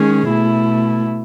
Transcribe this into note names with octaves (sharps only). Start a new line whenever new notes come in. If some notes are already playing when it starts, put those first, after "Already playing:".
Already playing: D#3 G#3 C#4 G#4
B2 A3 E4